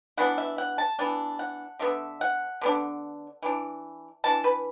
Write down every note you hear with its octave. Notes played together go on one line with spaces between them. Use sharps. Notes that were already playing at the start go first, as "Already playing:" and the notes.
E3 B3 D4 F#5
E5
F#5
A5
E3 B3 D4 A5
F#5
D3 B3 D4 E5
F#5
D3 B3 D4
E3 D4
E3 D4 A5
B4